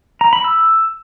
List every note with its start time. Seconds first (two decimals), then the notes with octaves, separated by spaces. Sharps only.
0.21 A#5
0.33 B5
0.44 E6